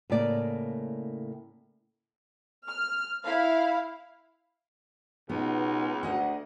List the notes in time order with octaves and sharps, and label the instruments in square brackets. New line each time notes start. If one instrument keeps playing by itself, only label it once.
[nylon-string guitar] A2 C#3 A#3 D5
[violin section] F6
E4 F5
[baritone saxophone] C#2 [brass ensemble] B2 D#4 [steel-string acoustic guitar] B3
[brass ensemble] D2 [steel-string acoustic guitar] F#4 D#5 F#5